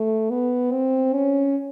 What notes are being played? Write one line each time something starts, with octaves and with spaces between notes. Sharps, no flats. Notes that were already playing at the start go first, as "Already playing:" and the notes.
Already playing: A3
B3
C4
C#4